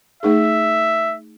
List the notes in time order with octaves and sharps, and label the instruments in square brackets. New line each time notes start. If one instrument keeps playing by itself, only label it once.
[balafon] A3 D#4 G#4 [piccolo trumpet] E5